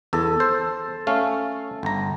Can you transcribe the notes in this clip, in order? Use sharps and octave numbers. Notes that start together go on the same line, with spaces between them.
E2 A4
C5
A3 C#4 F5
G1 A#5